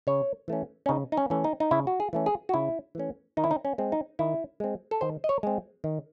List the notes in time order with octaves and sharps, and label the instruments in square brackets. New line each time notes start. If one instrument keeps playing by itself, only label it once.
[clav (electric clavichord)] C#3 C#5
E3 A3 C#4
C#4
C#3 D#4
D#4
C#4
E3 A3 C#4
D#4
D#4
C#3 E4
F#4
G#4
E3 A3 C#4
G#4
F#4
C#3 E4
E3 A3 C#4
D#3 D#4
E4
D#4
C#4
G#3 C4
D#4
D#3 E4
G#3 C4
A4
D#3 C5
D#5
C#5
G#3 C4
D#3